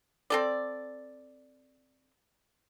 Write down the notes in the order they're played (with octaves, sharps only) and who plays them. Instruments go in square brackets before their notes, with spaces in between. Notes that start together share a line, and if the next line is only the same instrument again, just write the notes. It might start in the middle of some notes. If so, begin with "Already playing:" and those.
[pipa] C4 A4 D5